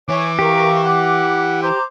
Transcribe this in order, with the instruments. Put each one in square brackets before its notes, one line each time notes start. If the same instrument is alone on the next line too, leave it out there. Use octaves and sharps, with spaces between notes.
[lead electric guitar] E3 E4 [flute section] C#5 G#5 C#6 [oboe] D6
[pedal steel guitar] G4 [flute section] A#4 F5 C#6
[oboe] F#5 [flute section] D6
[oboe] C5 [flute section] A#5 D6